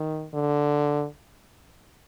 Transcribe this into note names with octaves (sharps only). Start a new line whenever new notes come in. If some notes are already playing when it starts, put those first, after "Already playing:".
Already playing: D#3
D3